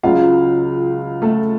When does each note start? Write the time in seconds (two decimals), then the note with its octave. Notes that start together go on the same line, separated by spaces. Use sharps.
0.03 C#2 C#3 F#3 F4 F5
1.22 A3 A4